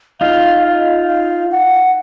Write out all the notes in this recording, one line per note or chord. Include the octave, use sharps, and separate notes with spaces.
D#4 F4 F5
F5
F5
F#5